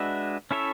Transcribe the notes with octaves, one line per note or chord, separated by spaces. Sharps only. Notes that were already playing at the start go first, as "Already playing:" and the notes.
Already playing: G#3 D4 F#4 B4 E5
C#4 E4 A4 C#5 E5